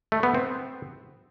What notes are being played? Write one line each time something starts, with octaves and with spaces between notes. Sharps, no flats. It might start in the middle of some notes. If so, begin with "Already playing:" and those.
A3
B3
C4